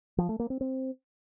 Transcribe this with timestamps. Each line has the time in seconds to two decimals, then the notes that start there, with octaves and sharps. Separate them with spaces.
0.18 F3
0.29 A3
0.39 A#3
0.50 C4
0.61 C4